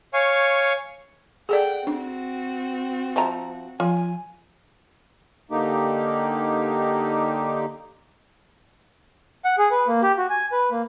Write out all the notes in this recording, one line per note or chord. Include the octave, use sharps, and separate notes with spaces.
C#5 F5 G#5 C#6
G#4 A4 D5 F#5 G5
C4 D4 F#4
F3 E5 A#5
F3 F4 G#5
D3 A#3 D#4 G4
F#5
G#4
B4
A#3
G4
F#4
G#5
B4
A#3